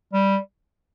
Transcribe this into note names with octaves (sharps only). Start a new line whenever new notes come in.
G3